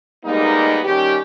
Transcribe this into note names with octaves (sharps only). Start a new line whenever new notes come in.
G3 G#3 A#3 B3 D#4
D#3 G3 C#4 G4